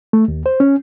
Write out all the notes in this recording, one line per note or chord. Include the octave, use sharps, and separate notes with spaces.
A3
D#2
C5
C#4